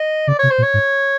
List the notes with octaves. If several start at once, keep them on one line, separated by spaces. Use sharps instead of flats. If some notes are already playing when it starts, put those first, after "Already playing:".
Already playing: D#5
C#3 D5
C3 C#5
C5
A#2
C#5
G#2